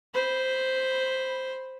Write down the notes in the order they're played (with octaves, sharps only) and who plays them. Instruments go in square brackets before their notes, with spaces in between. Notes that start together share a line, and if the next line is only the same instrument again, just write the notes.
[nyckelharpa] C5 B5